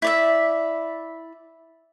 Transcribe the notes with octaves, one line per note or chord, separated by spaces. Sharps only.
E4 D5 E5